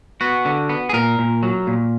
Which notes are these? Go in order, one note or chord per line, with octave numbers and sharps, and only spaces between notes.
B3 F#4
D3
B3
G#4
A#2 A#4
A#2
F#3
A#2